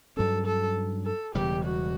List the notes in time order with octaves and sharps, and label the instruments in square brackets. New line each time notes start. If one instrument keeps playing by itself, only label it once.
[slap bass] G2 F#3 C#4 [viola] A4
[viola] A4
A4
[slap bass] E1 E2 C#3 G3 [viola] G4
[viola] F#4